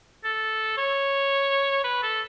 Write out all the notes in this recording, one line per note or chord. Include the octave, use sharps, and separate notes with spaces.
A4
C#5
B4
A4